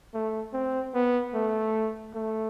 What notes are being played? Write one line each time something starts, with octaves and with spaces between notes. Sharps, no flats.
A3
C4
B3
A3
A3